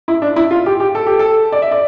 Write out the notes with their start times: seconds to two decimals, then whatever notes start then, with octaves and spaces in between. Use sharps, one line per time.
0.08 E4
0.22 D4
0.36 E4
0.51 F4
0.66 G4
0.80 G4
0.95 A4
1.07 G4
1.19 A4
1.52 D5
1.62 E5
1.71 D5